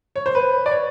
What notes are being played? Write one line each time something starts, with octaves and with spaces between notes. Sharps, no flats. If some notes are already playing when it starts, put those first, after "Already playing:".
C#5
C5
B4
D5
C#5